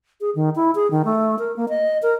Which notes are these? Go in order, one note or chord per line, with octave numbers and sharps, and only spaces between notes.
G#4
D#3
E4
G#4
D#3
A3
A#4
A#3
D#5
A#4